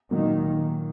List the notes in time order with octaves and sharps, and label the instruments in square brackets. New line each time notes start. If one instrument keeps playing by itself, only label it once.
[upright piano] A#2 F#3 A#3 [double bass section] D#3